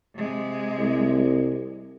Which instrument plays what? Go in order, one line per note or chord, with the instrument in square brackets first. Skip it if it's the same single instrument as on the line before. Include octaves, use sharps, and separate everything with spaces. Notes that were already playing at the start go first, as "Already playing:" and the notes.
[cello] C3 G#3
[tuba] C2